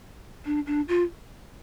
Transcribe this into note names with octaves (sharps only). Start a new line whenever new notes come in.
D4
D4
F4